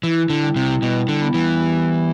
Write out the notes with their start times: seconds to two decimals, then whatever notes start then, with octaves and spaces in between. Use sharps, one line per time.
0.03 E3 E4
0.30 D3
0.43 G3
0.56 C3
0.82 B2 G3
1.08 D3
1.21 B3
1.34 E3
1.61 G4